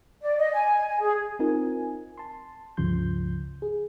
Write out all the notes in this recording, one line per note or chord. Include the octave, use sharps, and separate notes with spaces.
D5
D#5
G#5
G#5
G#4
C4 D#4 F4 A#4 G#5
A5 C6
C#2 G2 C#3 F3 C6 G6
G#4